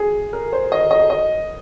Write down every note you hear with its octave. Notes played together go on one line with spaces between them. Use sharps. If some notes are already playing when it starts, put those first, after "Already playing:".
Already playing: G#4
A#4
C5
D#5
D#5
D#5